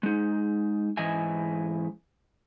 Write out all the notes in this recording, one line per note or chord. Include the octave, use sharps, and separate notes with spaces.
G#3 D#4
G#2 E3 D#5 E5 G#5